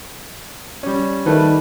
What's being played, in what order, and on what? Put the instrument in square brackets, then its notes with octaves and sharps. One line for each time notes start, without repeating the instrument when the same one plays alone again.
[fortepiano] G3 C#4
[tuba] D#3 [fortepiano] G3 A3 B4